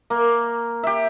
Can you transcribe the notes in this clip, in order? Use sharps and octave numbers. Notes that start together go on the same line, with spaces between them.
A#3
G4 E5